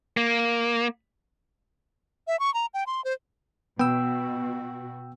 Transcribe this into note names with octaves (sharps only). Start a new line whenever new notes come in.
A#3
E5
C#6
A#5
G5
C6
C5
B2 B3 F#4 G5 E6